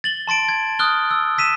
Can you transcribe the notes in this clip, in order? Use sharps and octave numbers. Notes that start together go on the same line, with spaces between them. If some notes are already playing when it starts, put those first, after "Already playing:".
A6 F#7 G7
A5 C6 A6 D7
G#6
D#6 F6 F#6 G7
E6
E6 B6 D#7 E7